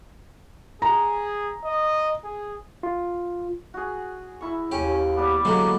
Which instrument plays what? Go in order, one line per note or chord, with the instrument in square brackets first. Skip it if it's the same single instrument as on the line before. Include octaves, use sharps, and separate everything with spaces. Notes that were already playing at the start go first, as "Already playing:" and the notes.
[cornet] G#4 [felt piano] A#5
[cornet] D#5
G#4
[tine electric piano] F4
[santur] F#4 G#4
E4 C#6
[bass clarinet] D#2 [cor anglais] C#4 [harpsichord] G4
[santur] G3 B3 [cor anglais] D5
[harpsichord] D3 F#3 G#3 [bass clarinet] A#3